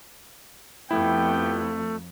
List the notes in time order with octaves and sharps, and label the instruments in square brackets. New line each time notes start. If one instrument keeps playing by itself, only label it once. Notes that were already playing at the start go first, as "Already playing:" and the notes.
[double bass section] F2 [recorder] A3 [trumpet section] B3 G4 G5 [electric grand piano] E4